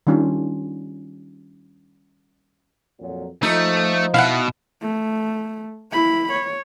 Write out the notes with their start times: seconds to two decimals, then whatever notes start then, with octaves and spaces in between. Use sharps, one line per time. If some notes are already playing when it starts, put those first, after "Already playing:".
0.07 D#3 G3 C#4 D4 F4
2.99 F2 A#2 F#3
3.43 F3 A3 D#4
4.14 B2 E4 F5 F#5
4.82 A3
5.91 E4 B5
6.32 C#5